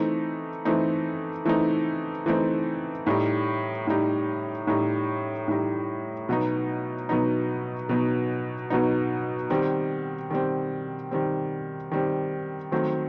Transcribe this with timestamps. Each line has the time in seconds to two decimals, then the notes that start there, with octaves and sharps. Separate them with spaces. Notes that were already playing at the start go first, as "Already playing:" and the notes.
Already playing: E3 A3 C4 D#4
0.65 E3 A3 C4 D#4
1.45 E3 A3 C4 D#4
2.26 E3 A3 C4 D#4
3.06 A2 G3 D#4
3.87 A2 G3 D#4
4.67 A2 G3 D#4
5.48 A2 G3 D#4
6.29 B2 F#3 B3 D#4
7.09 B2 F#3 B3 D#4
7.89 B2 F#3 B3 D#4
8.70 B2 F#3 B3 D#4
9.50 D#3 G3 C4
10.31 D#3 G3 C4
11.11 D#3 G3 C4
11.92 D#3 G3 C4
12.72 D#3 F#3 A3 C4